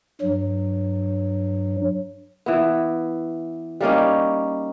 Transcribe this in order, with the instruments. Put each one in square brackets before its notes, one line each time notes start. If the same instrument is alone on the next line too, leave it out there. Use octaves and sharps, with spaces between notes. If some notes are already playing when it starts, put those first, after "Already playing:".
[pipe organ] G2 F#3
[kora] E3 B3
G3 A#3 C#4 D#4